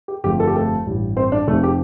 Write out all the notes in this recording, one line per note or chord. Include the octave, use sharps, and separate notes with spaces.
G4
G1 F2 F3 A3 G4
A4
G4
A3 A4
A1 G2 G3
C4 C5
D4 D5
F1 F2 C3 A3 A4
G4